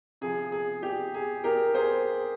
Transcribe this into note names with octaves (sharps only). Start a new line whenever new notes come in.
C3 F3 G#4
G#4
G4
G#4
G4 A#4
G#4 C5